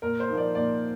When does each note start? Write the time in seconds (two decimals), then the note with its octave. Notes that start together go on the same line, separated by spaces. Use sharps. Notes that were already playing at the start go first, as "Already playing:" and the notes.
0.02 A#2 A#4
0.20 C5
0.28 F3 A#3 D#4 A#4
0.37 D5
0.55 A#2 D5